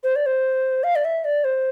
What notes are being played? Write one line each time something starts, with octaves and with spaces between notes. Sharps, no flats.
C5
D5
C5
F5
D5
E5
D5
C5